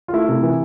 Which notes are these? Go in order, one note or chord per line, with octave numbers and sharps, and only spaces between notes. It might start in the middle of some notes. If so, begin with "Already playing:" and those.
F4
A3 E4
C3
E3